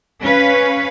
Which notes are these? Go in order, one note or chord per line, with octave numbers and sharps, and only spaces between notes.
C#4 B4 F5